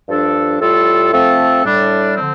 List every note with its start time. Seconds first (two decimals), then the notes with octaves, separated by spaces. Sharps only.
0.08 G2 F3 D4 A4
0.60 A2 G3 F4 A4
1.12 F3 A3 C4 A4
1.64 A2 G3 D4
2.16 D3 F3 C4